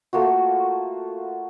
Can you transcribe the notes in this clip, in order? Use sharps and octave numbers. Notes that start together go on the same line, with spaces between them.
A3 A#3 F4 F#4